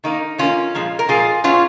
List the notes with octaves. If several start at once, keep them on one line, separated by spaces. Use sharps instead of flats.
D#3 A#3 D#4
D#3 A#3 C#4 F4
A#2 F3 G#3
A#4
A#2 F3 G#3 F4 G#4
A#2 F#3 B3 C#4 F4